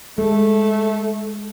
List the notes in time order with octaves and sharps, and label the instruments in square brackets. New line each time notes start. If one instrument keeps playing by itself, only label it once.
[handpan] G#3 A4 [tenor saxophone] A3